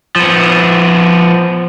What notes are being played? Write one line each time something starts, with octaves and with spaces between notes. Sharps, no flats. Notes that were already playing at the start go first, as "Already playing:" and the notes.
F3 B3